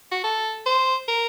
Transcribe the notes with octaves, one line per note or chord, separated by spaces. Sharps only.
F#4
A4
C5
A#4